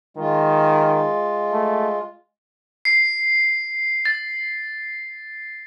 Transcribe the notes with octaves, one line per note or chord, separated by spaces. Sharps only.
D#3 G#3 F4
A3
C7
A6